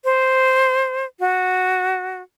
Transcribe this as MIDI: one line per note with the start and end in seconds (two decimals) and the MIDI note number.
0.05 1.05 72
1.20 2.22 66